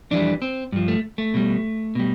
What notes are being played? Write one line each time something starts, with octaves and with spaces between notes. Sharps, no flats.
F2 E3 G3 D4
C4
G2 F3
A3
A3
B2 G3
B2 G3